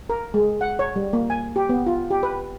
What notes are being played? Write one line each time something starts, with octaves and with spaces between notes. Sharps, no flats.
A#4
G#3
F#5
C#5
G3
A#3
G#5
G4
B3
F4
G4
B4